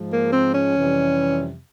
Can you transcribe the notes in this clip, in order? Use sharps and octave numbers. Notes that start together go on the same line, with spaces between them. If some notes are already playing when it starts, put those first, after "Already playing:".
Already playing: G#2 F3 G#3
A#3
C4
C#4
F2 C3 E3 G3